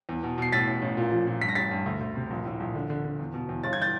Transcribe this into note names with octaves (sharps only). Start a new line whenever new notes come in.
E2
B2
B2 C7
A2 A6 B6
A1
A1
A#2
F3
A#2
G2 B6
A#6
A1 A6 B6
G2
D2
D2
C3
A#1
A2
A#1
D3
D3
D3
E2
B2
E2
G1 A6
G#6
E3 G6 A6